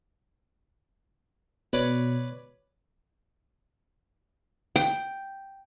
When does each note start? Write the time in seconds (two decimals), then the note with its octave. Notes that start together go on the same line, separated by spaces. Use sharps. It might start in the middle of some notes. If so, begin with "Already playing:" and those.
1.73 B2 B4 C#5 D5
4.76 G5